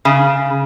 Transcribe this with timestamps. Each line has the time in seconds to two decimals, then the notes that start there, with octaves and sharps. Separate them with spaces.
0.05 C#3